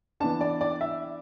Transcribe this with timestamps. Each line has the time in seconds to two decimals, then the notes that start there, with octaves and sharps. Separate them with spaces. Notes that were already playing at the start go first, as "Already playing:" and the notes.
0.20 E3 B3 D4 A5
0.41 D5
0.61 D5
0.81 E5